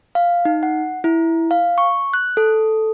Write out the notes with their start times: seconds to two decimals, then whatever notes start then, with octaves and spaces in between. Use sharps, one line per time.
0.15 F5
0.45 D#4
0.63 F#5
1.04 E4
1.51 F5
1.78 C#6
2.14 F#6
2.37 A4